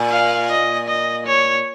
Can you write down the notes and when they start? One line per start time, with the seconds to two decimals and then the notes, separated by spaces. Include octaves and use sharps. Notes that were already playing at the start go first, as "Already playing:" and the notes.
Already playing: A#2
0.11 F5
0.50 D#5
0.88 D#5
1.27 C#5